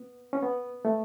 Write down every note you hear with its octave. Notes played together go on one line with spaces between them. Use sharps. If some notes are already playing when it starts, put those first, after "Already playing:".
Already playing: B3
C#4
B3
A3